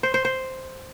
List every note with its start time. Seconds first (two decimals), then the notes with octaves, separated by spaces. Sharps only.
0.03 C5
0.14 C5
0.25 C5